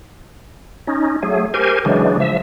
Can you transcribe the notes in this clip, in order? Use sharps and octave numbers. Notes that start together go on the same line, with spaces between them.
C#4 D#4
F#3 A3 G#4
G4 A#4 C5 G#5
C#3 E3 F#3 G#3 D4
F3 E5